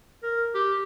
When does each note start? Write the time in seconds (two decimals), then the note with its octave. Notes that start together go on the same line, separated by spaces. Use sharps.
0.23 A#4
0.54 G4